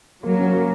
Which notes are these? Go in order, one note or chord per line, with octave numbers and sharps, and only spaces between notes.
F#3 A#3
C#4
A#3